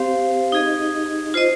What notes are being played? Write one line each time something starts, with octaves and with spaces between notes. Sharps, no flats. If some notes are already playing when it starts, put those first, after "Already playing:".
Already playing: C4 G4 C5 F5
D#4 G#4 D#5
F4 C5 D#5